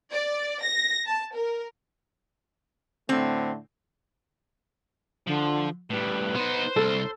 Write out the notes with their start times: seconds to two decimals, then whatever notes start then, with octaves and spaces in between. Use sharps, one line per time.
0.13 D5
0.63 A#6
1.06 A5
1.36 A#4
3.09 A2 D3 A3 C4
5.27 D3 F3
5.90 A2 G3 B4
6.36 B3 D#4 C5
6.76 C2 A4